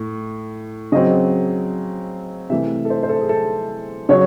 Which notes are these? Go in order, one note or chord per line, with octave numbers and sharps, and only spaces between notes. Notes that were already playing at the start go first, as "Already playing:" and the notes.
Already playing: A2
C#3 F#3 C4 D#5
C3 E3 A3 E5
A4
C5
C5
A4
G#4
A4
C#3 F#3 C#5